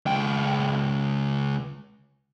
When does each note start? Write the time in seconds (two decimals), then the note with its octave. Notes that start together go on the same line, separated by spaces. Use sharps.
0.06 C#2 G5